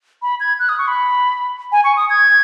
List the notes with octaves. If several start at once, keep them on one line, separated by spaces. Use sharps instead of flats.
B5
G#6
F#6
D#6
C#6
B5
G#5
C#6
D#6
G#6